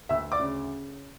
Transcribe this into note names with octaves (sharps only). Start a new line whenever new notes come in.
D2 E5 E6
D5 D6
C#3